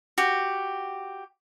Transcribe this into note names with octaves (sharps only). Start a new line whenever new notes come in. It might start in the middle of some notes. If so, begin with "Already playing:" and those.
F#4 G4